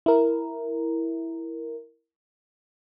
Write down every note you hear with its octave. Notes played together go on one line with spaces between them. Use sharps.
E4 A#4